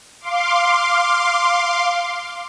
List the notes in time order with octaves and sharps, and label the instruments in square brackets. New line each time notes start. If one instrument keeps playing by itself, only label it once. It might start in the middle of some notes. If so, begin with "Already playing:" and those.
[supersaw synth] F5 C6 D6